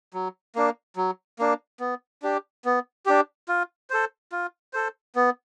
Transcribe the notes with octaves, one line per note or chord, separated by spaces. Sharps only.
F#3
A#3 D4
F#3
A#3 D4
B3
D4 G4
B3
D4 G4
F4
A4 C5
F4
A4 C5
B3